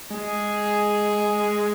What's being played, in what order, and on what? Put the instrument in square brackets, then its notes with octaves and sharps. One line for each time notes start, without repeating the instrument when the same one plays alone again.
[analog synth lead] G#3 [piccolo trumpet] G#4